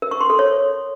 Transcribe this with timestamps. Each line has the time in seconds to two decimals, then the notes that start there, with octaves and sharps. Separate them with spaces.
0.02 A#4
0.11 C#6
0.21 C6
0.30 A4
0.39 C#5